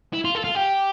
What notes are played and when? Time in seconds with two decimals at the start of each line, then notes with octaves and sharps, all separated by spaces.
0.13 E4
0.24 F4
0.35 A4
0.44 F4
0.55 G4